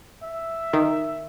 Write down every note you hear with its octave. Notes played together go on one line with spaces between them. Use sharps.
E5
D#3